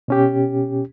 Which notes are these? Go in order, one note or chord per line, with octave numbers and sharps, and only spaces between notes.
B2 C#4 G4